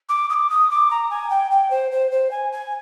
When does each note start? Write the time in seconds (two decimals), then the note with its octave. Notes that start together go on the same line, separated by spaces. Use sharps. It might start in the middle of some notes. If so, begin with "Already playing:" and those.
0.09 D6
0.29 D#6
0.33 D6
0.49 D#6
0.70 D6
0.90 A#5
1.10 G#5
1.30 G5
1.51 G5
1.70 C5
1.91 C5
2.11 C5
2.31 G#5
2.52 G#5